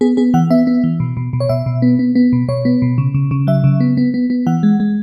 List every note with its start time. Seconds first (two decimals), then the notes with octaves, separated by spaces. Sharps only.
0.01 B3 G#4
0.17 B3 G#4
0.34 E3 F#5
0.50 B3 E5
0.67 B3
0.84 E3
1.00 B2
1.17 B2
1.33 B2
1.40 C#5
1.49 B2 E5
1.66 B2
1.82 B3
1.99 B3
2.15 B3
2.33 B2
2.48 B2 C#5
2.65 B3
2.82 B2
2.98 C#3
3.14 C#3
3.31 C#3
3.47 F#3 E5
3.64 C#3
3.80 B3
3.97 B3
4.14 B3
4.30 B3
4.47 E3 F#5
4.63 G#3
4.80 G#3